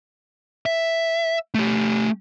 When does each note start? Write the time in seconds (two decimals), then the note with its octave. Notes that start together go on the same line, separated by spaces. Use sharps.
0.66 E5
1.55 A3 G4